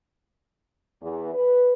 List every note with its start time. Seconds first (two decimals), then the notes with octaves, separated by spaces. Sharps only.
1.02 E2
1.33 B4